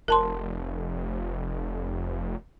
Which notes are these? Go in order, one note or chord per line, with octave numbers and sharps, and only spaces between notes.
F1 A#4 A5 C6